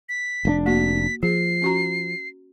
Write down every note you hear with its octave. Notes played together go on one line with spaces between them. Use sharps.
B6
F1 A2 D4
A#3 F#4 B6
F3 G#4 C7
C#4 F#4 A#5